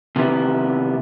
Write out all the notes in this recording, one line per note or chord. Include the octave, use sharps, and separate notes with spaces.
C3 D#3 G3 B3 E4